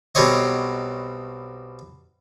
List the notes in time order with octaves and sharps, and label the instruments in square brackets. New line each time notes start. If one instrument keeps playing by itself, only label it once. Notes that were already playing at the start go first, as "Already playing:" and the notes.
[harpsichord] B1 B2 G3 C4 C#5 D#5